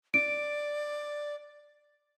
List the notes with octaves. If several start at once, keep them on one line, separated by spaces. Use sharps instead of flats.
D5 D7